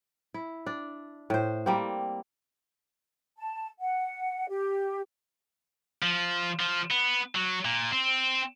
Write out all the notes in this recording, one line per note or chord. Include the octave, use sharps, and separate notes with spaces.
E4
D4
A2 C5
G3 A#3 C4
A5
F#5
G4
F3
F3
B3
F#3
A#2
C4